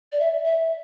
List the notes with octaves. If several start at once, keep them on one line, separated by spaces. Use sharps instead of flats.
D5
E5
E5